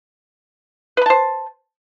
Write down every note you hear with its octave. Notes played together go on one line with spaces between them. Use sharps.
B4 C5 A5 B5